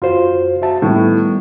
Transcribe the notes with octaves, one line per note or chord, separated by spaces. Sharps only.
F#2 F4 F#4 C5
F#4 E5 A5
A2 D#3 G3 B3